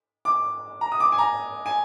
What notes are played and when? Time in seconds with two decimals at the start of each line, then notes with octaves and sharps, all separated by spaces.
0.25 D6
0.81 A#5
0.92 D#6
1.00 D6
1.12 G#5
1.18 A#5
1.66 G#5